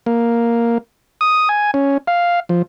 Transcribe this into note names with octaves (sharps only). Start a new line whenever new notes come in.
A#3
D#6
G#5
C#4
F5
F3